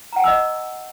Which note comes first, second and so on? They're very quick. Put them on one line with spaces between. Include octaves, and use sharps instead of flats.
A#5 F#5 G#5 E6 D#5